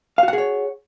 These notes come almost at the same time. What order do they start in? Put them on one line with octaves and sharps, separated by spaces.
F5 F#4 F#5 G#4 C#5